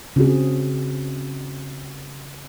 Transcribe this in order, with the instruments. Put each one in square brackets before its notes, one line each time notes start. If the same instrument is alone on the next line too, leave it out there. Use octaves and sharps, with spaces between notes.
[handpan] C#3 C4 F#4 G#4